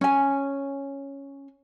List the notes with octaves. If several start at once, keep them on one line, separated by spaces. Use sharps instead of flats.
C#4 G#5